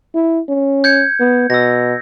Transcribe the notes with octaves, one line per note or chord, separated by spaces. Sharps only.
E4
C#4
G6 G#6 C#7
B3
B2 E6 A#6